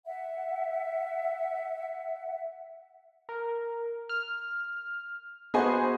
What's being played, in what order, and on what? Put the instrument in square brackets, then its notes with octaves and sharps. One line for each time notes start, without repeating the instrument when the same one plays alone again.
[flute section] E5 F#5
[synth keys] A#4
F6
[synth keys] B3 F#4 C5 [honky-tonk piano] G#4 D#5 G#5